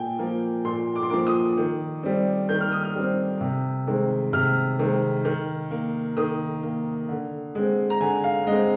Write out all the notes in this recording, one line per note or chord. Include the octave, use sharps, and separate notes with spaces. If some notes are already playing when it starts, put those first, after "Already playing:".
Already playing: A#2 G5 G#5
F3 A#3
A#2 C6
D6
C6
F3 A#3 D6
D#6
D#3
G3 C4
D#3 G6
F6
D#6
F6
G3 C4
C3
D#3 G#3 C4
C3 F6
D#3 G#3 C4
D#3
A#3
D#3 D#6
A#3
D3
G#3 C4
A#5
D3 G#5
F5
G#3 C4 D#5